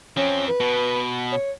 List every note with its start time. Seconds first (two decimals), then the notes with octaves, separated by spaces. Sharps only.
0.17 F3 C4 C#4
0.48 B4
0.60 B2
1.32 C#5